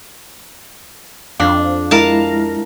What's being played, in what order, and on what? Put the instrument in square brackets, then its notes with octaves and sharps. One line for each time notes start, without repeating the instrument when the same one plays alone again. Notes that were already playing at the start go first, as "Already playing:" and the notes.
[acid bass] F2 [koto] D4 [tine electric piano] F5
[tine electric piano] G#3 E4 [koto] A#4 F5 A5